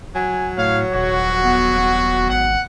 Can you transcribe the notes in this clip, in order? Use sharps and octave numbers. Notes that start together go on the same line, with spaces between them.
F#3 G#5
A2 C#5 F5
D#1 F#4
B3
B3
G#1 F#5